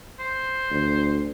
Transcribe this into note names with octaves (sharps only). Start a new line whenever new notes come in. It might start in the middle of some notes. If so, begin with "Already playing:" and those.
C5
D2